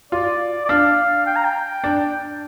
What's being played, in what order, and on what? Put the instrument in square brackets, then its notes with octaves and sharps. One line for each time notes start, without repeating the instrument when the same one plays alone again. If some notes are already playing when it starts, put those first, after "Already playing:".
[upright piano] F4 [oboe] D5
[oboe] D5
[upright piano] D4 [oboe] F5
[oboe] G5
A#5
G5
[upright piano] D4